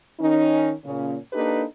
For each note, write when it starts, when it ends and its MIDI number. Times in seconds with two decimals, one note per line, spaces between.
0.20 0.71 51
0.20 0.71 61
0.20 0.71 63
0.85 1.14 46
0.85 1.14 49
0.85 1.14 61
1.33 1.63 58
1.33 1.63 62
1.33 1.63 63
1.33 1.63 67
1.33 1.63 69
1.33 1.63 71